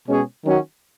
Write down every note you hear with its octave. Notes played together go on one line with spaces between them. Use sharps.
B2 G#3 C#4 G#4 C#5
D#3 F#3 C#4 F#4